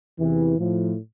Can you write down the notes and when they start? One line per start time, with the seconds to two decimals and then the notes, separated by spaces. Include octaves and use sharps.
0.19 E2 C3 E3
0.59 A2 F3